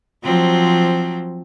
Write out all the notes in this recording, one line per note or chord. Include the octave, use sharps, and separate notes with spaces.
F3 F#3 C4